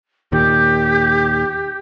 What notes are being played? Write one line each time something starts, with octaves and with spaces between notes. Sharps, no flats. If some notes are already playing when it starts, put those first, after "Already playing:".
D#2 A#2 D#3 G4